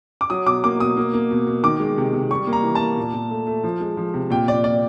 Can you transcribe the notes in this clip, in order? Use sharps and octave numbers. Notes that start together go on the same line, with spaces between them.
D6
F#3 D#6
B2 D6
A#3 D6
B2 D#6
A#3
A#3
B2
B2
D#3 D6
G#3
C3
C3
G3 C#6
A#3
A#5
E3
A5
A#3
A#2
A#2
A3
A3
F3
G#3
F3
C3
A#2 G5
A#2 D5
A#2 D5